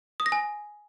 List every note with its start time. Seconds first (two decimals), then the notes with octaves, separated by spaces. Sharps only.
0.20 D#6
0.26 A#6
0.32 G#5